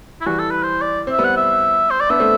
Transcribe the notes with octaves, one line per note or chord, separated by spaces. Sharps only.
E4
E3 G3 F#4
A4
B4
C5
D5
C4 E5
G3 B3
F#5
E5
C5
D5
B3 D4 E5
A3 C4